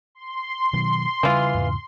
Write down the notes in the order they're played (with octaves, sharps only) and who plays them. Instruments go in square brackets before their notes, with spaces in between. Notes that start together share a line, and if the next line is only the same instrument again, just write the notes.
[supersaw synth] C6
[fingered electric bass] B2 D#3 F#3
[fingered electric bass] C#3 G3 [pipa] E3 F4
[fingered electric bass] E2 G#2 C#3